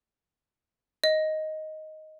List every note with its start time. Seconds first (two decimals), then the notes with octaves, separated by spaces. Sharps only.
1.04 D#5